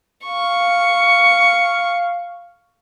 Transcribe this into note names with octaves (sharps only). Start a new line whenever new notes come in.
F5 C#6